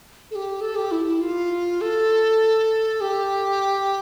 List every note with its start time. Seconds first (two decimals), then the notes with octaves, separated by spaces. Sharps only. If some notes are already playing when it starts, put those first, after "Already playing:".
0.31 A4
0.35 G4
0.61 A4
0.76 G4
0.92 E4
1.06 E4
1.21 F4
1.81 A4
3.01 G4